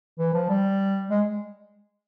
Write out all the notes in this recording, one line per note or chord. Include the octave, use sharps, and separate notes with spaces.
E3
F3
G3
G#3